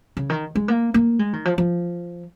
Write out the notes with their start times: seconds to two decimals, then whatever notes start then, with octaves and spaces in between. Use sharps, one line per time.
0.17 C#3
0.30 D#3
0.55 G#3
0.68 A#3
0.94 A#3
1.19 G#3
1.33 D#3
1.45 F3
1.58 F3